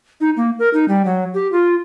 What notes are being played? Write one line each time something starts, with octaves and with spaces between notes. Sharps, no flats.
D#4
A#3
A#4
D#4
G3
F#3
G4
F4